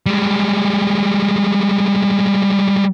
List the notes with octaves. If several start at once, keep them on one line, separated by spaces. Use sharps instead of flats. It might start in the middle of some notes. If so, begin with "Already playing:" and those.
G3 G#3